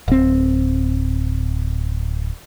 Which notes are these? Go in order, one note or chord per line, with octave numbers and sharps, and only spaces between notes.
D1 C4